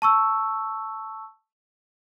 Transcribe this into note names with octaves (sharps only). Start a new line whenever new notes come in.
A5 C#6 E6